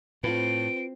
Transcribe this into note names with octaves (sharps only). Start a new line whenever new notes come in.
A2 C4 F4 B4 D7